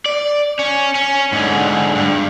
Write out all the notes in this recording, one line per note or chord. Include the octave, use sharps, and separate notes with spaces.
D5
C#4
C#4
G#2 D3
G2